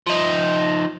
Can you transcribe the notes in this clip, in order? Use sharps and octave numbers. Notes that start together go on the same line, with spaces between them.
F3 D#4